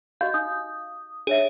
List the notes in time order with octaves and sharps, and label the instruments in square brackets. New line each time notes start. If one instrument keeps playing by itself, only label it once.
[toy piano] F#4 G4 D#5 [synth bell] F5 G6
[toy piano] D#4 [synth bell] D#6
[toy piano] D4 C#5 E5 [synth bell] G#4